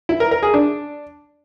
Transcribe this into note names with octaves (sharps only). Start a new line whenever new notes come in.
E4
A#4
A#4
G#4
D4